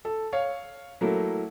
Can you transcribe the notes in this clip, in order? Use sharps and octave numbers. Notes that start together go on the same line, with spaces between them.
A4
C#5 F5
F#3 A3 A#3 E4